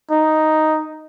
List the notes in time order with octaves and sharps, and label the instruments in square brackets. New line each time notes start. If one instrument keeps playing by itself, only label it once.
[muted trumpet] D#4